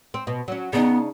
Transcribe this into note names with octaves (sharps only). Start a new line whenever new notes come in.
C4
B2
F#3 C#4
C#3 B3 D4 D#4